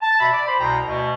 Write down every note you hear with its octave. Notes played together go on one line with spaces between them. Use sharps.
A5
B2 F#4 E5 A5 B5
D5
C5 B5
C2 B2 G5 A#5
D2 B2